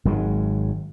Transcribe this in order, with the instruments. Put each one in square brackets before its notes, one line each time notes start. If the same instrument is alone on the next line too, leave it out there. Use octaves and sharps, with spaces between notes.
[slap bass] G#1 D#3 F#3 G#3